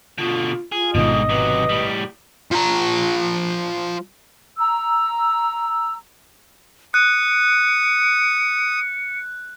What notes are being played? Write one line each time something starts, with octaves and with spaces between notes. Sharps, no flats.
B2 D3 F4
F4 G#4
G#1 G#2 B2 D3 D#3 D#5
C3 F#3 B4
A2 G3
F3 A#5
A#5 E6
D#6 F#6 C#7